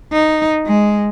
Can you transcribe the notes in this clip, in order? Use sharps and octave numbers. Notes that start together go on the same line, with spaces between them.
D#4
G#3